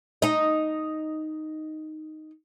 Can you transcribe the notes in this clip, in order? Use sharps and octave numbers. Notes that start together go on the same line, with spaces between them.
D#4 D#5